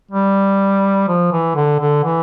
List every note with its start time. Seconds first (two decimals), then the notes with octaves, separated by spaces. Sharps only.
0.11 G3
1.08 F3
1.32 E3
1.56 D3
1.80 D3
2.04 E3